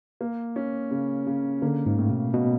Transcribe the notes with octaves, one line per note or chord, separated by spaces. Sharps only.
A#3
C#4
C#3
C#3
D3 A#3
G#2
A2
B2
B2 F#3